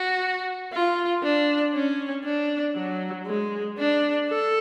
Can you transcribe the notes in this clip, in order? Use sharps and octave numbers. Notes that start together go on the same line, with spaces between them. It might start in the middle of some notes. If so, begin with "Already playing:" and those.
Already playing: F#4
F4
D4
C#4
D4
F#3
G#3
D4
A4